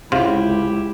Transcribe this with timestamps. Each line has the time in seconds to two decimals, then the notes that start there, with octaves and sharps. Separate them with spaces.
0.12 C#2 G#2 C3 E4 F4 G4 F5 C6